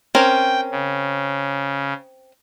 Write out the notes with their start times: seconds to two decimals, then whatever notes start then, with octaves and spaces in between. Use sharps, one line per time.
0.15 C4 C#4 A#4 G5
0.71 C#3